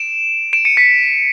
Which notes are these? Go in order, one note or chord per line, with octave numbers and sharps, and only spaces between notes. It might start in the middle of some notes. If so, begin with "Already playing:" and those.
Already playing: D7 E7
D7 E7
C#7 D#7
B6 C#7